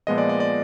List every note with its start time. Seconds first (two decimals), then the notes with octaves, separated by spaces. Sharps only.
0.07 A#2 F3 G#3 B3 D#5
0.18 D5
0.29 D5
0.40 D5